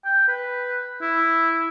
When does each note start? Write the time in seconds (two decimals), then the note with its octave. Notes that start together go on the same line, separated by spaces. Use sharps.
0.05 G5
0.28 B4
1.02 E4